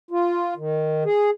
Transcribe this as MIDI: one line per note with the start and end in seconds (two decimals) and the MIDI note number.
0.11 0.54 65
0.57 1.04 51
1.05 1.30 68